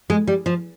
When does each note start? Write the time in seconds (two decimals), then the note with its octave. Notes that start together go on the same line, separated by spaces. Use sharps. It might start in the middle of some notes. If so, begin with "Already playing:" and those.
0.10 G#3
0.27 G3
0.46 F3